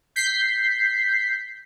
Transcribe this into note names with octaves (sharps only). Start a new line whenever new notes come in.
G6 B6 C7